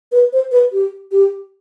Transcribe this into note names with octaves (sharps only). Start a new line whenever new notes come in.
B4
C5
B4
G4
G4